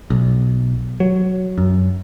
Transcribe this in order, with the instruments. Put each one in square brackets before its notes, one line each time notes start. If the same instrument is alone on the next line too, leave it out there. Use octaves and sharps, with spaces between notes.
[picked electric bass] B1
F#3
F#2